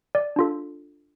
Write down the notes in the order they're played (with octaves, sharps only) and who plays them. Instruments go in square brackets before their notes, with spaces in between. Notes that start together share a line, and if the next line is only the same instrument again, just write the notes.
[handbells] D5
D4 F4 A4